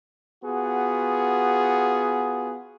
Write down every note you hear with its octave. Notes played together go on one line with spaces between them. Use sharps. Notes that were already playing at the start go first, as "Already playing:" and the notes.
B3 F4 F#4 G#4